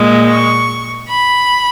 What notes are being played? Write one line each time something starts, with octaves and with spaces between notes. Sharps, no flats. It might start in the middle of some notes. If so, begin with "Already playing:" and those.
Already playing: A#2 G#3
C#6
B5